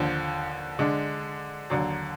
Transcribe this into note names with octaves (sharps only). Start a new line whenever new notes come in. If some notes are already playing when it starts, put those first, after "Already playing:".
Already playing: D#2 D3 F3
D3 G#3 D4
D#2 D3 F#3